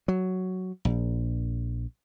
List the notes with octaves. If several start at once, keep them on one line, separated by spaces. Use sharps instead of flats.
F#3
A#1